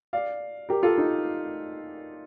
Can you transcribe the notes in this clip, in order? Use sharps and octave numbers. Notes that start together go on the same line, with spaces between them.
D5 F5
G4 A#4
F4 A4
D#4